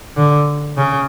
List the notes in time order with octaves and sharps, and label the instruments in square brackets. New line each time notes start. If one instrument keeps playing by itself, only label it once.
[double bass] D3
C#3